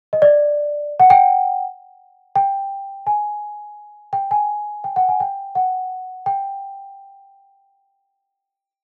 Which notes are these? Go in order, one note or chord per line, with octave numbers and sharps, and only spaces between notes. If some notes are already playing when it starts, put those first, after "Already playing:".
D#5
D5
F#5
G5
G5
G#5
G5
G#5
G5
F#5
G#5
G5
F#5
G5